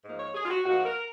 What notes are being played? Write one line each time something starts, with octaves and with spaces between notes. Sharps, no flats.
G#2 F3 A#3
C#5
G#4
F4
F#4
G#2 F3 A#3 F#4
A#4